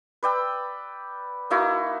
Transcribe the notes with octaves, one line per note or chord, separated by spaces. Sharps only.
B4 D5 G5 E6
A#3 D#4 E4 F#4